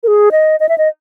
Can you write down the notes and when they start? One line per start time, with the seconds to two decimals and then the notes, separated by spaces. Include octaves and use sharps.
0.03 A#4
0.08 G#4
0.32 D#5
0.60 D#5
0.69 E5
0.78 D#5